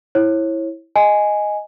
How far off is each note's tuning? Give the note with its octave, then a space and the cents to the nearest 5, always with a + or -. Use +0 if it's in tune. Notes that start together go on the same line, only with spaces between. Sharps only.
E4 -5 C#5 -35
D#5 +0 G#5 +0